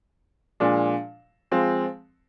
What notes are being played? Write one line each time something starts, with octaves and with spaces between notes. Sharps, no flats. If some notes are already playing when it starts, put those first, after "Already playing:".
A#2 F3 G#3 D4
F3 G#3 C4